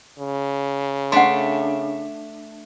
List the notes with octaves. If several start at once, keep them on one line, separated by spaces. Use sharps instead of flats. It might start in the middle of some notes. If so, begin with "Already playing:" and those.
C#3
A3 D4 F#5 C6